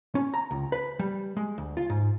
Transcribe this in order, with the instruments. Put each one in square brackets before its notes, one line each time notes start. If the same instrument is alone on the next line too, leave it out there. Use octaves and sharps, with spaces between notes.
[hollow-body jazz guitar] C#4
A#5
C#2
B4
G3
G#3
D2
F4
G#2